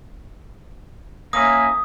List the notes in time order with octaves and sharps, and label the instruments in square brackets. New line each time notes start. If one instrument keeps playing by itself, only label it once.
[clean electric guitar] A#3 C#4 E4 [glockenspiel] D#6